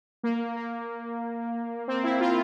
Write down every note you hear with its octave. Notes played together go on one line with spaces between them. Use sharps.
A#3
A#3
C4
E4
F4